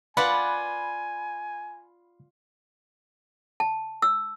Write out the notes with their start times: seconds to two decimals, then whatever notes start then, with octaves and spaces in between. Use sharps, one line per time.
0.17 F4 B4 D5 F#5 G#5 B5
3.60 A5
4.02 E6